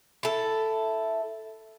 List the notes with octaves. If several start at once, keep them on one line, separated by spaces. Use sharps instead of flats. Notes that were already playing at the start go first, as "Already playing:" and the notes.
E4 A4